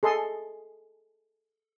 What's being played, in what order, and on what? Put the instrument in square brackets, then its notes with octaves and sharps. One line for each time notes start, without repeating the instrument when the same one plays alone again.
[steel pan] G#4 A4 D#5 C6